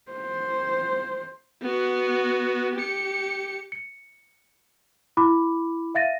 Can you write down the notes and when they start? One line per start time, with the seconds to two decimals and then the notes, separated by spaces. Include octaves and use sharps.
0.12 C5
1.62 B3 F#4
2.75 G4 C#7
3.72 C#7
5.17 E4 B5 D6
5.95 E5 F5 A6 A#6 D#7